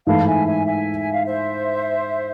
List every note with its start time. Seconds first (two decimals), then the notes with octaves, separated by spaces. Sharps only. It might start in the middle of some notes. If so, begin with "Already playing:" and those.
0.07 G#2 E3 A3 E4 F5 A5
0.26 E5 G#5
0.46 E5 G#5
0.66 E5 G#5
1.00 G#5
1.13 F5
1.25 C5 E5